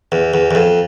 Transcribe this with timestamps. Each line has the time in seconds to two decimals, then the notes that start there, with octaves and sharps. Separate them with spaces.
0.12 E2
0.34 E2
0.51 E2
0.55 F2